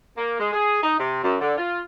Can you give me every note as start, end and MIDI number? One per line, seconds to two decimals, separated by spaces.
0.17 0.37 58
0.39 0.50 56
0.53 0.83 68
0.83 0.96 63
0.99 1.21 48
1.24 1.36 42
1.41 1.56 50
1.58 1.79 65